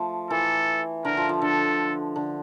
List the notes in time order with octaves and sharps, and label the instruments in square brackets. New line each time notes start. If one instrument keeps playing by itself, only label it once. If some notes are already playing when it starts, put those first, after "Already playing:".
Already playing: [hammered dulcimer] F3 A3
[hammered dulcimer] E3 [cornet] A4
[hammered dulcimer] D3 [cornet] A#4
[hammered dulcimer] F3
F3
[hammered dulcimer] D3 [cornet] A4
[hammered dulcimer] D3